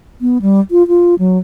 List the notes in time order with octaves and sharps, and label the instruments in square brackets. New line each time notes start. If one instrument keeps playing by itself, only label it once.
[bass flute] B3
G3
F4
F4
F#3